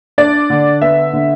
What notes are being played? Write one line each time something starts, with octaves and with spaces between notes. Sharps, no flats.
D4 D5
D3
B3 E5
D3